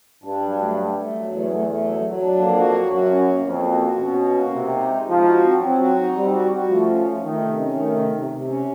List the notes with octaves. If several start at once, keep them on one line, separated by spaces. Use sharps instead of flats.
G2 D4
F#3
A3
A3
A3
F#3
E2 A3
A3
A3
F#3
F#3
D4
F2 A#3
F#4
F#3
F#2 F#4
C#4
A#3
F2 A#3
F#4
F#4
B2 C#4
F#4
A#3
C3 D#4
D#4
G#3
F3 D#4
F#4
C4
F#3 C4
F#4
D#4
G3 C4
F#4
F#4
F3 A3
C#4
A3
D#3 A3
C3
C#4
D#3 A3
C3
C3
C3
C#4